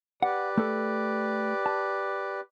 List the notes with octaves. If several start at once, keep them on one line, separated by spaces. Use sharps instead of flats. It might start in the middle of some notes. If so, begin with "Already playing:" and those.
G4 B4 D5 F#5
A3 A4
A5